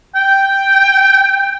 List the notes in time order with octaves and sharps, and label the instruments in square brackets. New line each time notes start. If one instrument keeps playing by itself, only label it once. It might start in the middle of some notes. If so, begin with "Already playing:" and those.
[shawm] G5